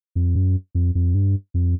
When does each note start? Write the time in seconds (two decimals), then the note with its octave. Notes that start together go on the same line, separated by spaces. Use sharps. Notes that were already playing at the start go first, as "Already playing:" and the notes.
0.15 F2
0.35 F#2
0.75 F2
0.95 F2
1.15 G2
1.54 F2